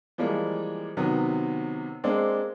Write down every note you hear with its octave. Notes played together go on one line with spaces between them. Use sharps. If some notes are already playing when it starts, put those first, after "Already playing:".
E3 F3 G3 G#3 A#3
C3 D#3 F#3 B3
G#3 A#3 C4 D4